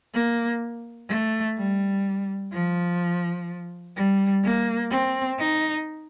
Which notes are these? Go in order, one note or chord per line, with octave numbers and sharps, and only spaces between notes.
A#3
A3
G3
F3
G3
A#3
C4
D#4